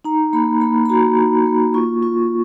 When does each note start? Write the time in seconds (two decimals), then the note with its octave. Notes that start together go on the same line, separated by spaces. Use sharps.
0.05 D#4 A#5
0.33 A#3 B5
0.61 A#3 B5
0.86 B5
0.89 F#4 A#5
1.18 D#4
1.47 A#3
1.74 F4 C#6
2.02 F4 C#6